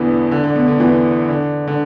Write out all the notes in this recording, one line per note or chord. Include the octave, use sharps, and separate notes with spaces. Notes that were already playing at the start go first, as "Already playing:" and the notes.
Already playing: E2 B2 D3 E3
D3
D3
B2
D3
E2 E3
D3
D3